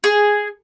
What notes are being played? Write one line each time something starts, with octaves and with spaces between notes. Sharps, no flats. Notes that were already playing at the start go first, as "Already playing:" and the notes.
G#4